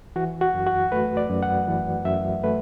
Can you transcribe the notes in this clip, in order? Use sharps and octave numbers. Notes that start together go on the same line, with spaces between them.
E3 F#4
F#4
F#2
F#4
A3 B4
D5
F#2
F#5
E3
F#2 E5
A3 B4